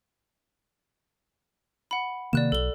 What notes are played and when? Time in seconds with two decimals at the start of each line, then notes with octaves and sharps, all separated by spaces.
1.91 F#5 B5
2.33 C3 D#3 A#3 D5 F#6 E7
2.52 B1 A4 G7